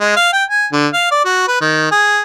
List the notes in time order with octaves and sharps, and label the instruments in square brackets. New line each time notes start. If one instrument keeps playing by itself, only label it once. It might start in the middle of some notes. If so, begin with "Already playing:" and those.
[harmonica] G#3
F5
G5
G#5
D3
F5
D5
F#4
B4
D#3
G#4